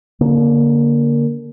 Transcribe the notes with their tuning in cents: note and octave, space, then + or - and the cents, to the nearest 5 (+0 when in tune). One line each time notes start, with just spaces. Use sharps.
D3 -35 A#3 +0